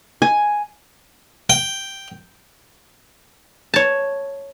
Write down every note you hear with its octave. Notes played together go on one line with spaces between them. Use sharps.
G#5
G5
C#5 A5